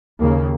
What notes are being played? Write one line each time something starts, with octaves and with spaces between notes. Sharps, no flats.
D#2 C#3 A#3